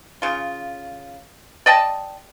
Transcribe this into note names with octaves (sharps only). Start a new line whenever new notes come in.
C#3 F4
D5 D#5 G5 A5